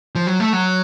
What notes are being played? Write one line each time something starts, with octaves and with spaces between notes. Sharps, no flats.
F3
F#3
A3
F#3